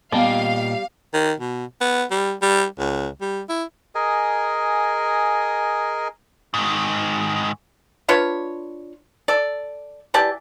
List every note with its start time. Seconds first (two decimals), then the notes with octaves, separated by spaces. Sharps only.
0.12 A#2 G3 B3 D#5 F5 G5 A5
1.14 D#3
1.40 B2
1.81 B3
2.11 G3
2.42 G3
2.79 C#2
3.21 G3
3.49 E4
3.95 G#4 A#4 D#5 G#5
6.54 G#2 D#3
8.08 D4 F4 B4 C#5
9.28 A4 D5
10.14 E3 G4 D5 A5